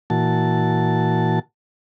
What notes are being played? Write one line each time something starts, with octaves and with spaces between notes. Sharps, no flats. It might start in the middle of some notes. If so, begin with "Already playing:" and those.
A#2 E3 F#4 A5